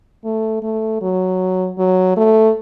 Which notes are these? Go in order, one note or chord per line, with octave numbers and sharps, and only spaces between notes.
A3
A3
F#3
F#3
A3